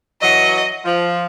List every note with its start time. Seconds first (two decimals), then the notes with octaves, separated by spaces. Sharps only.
0.22 E3 F#3 D#5
0.85 F3